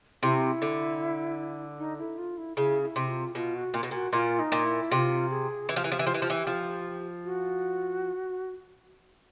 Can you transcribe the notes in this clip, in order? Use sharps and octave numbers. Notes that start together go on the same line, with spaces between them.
C3 E4
D3
D#4
E4
F4
E4
C#3 E4
E4
C3
F4
B2 F4
F#4
A#2
B2
A#2 F#4
A#2 F4
D#4
A#2
E4
C3 F4 F#4
G#4
E3 G#4
F3 G4
E3
F3
E3
F3
E3
F3
E3
F3
F#4